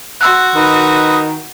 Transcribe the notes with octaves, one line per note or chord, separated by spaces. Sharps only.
F#4 C6 E6 F#6
D#3 B4 D#5